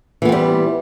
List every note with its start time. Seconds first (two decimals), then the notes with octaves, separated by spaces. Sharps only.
0.22 E3
0.25 B3
0.29 C4
0.32 G3